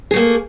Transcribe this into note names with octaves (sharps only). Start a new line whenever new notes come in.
A3 A#3 G#4